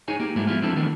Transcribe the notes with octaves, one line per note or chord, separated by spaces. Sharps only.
D#4 G#4 C#5 G#5
A#3 G4
G#2 F#3 G#3 A3 D4 E4
F3 B3 E4 F4
F3 C4 D4 E4 A4
D#3 E3 A3 B3 D4